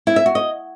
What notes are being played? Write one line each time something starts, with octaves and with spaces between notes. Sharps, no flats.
E4
E5
F#4
D#5